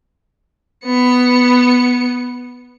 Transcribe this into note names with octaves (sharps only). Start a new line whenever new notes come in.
B3 C#7